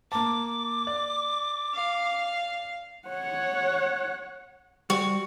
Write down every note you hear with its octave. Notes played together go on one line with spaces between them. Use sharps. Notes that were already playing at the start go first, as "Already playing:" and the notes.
A#3 A5 D6
D5
F5
C#5 F#5
G3 F#4